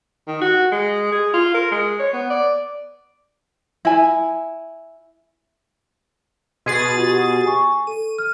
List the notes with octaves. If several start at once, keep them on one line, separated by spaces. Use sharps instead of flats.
D#3
F#4
G#3
G#4
F4
A#4
G#3
C#5
B3
D5
E4 G#5
B2 G#4 C6 G#6 A6 D#7
F4 G4
G#5 C#6
A4 D#7
F6